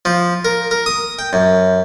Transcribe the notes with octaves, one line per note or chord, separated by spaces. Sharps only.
F3
A#4
A#4
D#6
G5
F#2